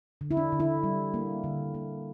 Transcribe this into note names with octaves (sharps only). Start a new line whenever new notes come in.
D3
E4
D4
D3
E4
G3
A#3
D3
A#3